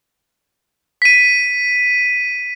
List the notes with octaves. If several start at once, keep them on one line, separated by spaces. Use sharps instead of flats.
B6 D#7